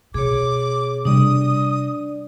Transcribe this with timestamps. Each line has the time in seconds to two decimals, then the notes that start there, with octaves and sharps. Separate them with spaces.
0.14 B2 G#4 C#5 D6
1.05 C3 G3 D4 D5 D#6